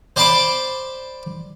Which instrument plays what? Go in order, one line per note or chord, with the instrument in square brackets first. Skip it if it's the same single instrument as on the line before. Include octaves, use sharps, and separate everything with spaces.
[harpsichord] C5 D5 A5 B5 C6 D6